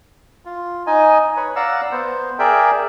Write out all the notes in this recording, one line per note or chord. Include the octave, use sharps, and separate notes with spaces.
F4
D#4 D#5 G#5
B4 C#5
D5 F5 F#5 A#5 E6
B3 C5
G#4 A#4 D5 E5 G5